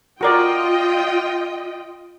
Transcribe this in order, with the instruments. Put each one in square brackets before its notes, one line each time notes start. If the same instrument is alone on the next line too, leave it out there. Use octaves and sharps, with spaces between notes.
[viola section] F4 D#5 G5 [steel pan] F#4 A#4 D5